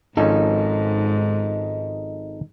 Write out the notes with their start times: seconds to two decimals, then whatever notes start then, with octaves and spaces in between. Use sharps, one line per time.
0.17 G#1 G#2 F3 C#4 D#4 A4